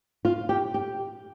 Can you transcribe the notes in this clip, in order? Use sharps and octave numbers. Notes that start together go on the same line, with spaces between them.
F4
G4
G4